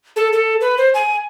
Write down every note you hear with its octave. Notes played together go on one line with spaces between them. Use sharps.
A4
A4
B4
C5
G#5